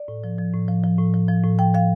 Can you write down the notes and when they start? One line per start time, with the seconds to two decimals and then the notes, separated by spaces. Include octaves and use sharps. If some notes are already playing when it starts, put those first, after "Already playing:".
Already playing: D5
0.08 A2
0.24 F3
0.39 F3
0.53 A2
0.68 F3
0.83 F3
0.98 A2
1.14 F3
1.28 F3
1.44 A2
1.59 F3 G5
1.74 F3 F5